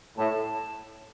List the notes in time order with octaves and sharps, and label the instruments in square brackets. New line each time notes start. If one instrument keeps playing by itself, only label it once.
[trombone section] A2 [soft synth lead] A5